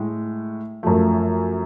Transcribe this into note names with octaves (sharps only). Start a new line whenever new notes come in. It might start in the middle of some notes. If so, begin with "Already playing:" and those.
Already playing: A2 G#3
F#2 F3 A3